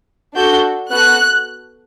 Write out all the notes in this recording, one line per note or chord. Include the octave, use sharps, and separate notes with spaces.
D4 F#4 A4 G6
B3 F#4 A4 F#6